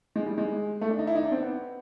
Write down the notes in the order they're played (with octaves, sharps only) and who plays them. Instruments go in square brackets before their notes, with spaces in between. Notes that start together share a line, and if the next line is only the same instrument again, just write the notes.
[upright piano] G#3
G3
G#3
A3
D4
D#4
E4
D#4
D4
C4
B3